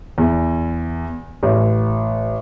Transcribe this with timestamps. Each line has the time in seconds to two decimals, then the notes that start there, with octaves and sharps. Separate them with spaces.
0.18 E2
1.43 A1